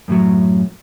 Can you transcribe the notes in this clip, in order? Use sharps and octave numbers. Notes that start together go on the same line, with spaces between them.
F#2 A2 F3 F#3